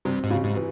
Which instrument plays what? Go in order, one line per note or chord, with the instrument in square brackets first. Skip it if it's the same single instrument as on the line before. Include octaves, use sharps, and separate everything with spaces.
[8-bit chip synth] G2 [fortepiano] C3
[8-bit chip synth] G#2
[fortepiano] C#3
[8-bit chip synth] G#2
[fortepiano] E3